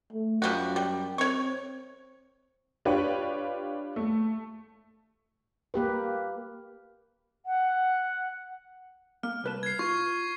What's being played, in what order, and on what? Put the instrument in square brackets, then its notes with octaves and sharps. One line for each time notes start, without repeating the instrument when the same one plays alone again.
[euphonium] A3
[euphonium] F#2 [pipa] F3 G3 F#4
[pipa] G3
[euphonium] C4 [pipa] C#5 C#6
[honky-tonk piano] D4 F4 G4 B4 C#5
A3
[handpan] A#3 G4 B4
[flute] F#5
[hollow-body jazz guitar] A#3 [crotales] F6
[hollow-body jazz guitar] C2 B4 A5
[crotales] G#6 C7
[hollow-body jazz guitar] F4 [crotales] C#6